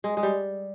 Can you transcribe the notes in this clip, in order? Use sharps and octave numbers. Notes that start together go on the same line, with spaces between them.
G#3
G#3
G3